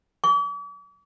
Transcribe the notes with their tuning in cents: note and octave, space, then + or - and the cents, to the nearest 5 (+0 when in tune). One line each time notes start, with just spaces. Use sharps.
D6 -45